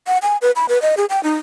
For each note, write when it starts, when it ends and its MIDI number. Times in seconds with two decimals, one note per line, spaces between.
0.07 0.18 78
0.22 0.37 80
0.42 0.51 71
0.56 0.66 83
0.69 0.81 71
0.82 0.95 75
0.97 1.05 68
1.10 1.23 79
1.23 1.34 63